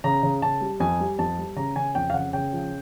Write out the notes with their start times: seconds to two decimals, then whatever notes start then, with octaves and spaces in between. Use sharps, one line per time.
0.04 C#3 A#5
0.23 C#3
0.42 C#3 A5
0.61 G3
0.80 F2 G#5
1.00 G3
1.18 F2 A5
1.38 G3
1.56 C#3 A#5
1.76 C#3 G#5
1.95 F2 G5
2.10 F5
2.14 C#3 F#5
2.33 C#3 G5
2.53 F3